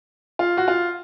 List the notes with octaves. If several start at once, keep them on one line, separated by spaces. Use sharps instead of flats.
F4
F#4
F4